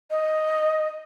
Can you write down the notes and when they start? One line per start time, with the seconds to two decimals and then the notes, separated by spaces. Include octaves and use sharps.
0.11 D#5